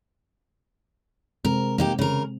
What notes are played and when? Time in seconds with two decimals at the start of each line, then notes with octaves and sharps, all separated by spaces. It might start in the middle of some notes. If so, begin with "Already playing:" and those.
1.45 C3 G#3 C4 A#4
1.78 A#3 D#4 G4
1.99 C#3 A#4